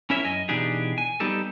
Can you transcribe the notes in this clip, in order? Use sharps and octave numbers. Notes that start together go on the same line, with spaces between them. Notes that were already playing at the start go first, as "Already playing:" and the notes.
C#4 E4 A#4 C#5 E5
F#2 D#5 G#5
B2 E3 D4 D#4 G4 G#4
G#5
G3 B3 D#4 G4 A4